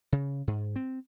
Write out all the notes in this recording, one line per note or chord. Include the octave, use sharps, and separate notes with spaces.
C#3
G#2
C4